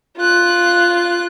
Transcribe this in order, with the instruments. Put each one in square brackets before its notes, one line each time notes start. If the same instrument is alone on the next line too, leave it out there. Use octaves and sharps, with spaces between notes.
[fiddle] F4 F#6